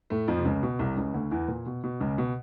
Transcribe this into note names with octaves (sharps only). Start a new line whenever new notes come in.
A2 A3
F2 F3
C3
C#2 C#3
B2
C2 C3
C#2 C#3
D2 D3
E2 E3
A#2
B2
B2
C#2 C#3
B2